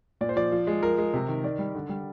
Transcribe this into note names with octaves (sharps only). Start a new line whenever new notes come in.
A#2 D5
C5
F3 D5
F3
G#3
F3 A#4
G#3
C3
D#3
D#3 D5
G3
D3
G3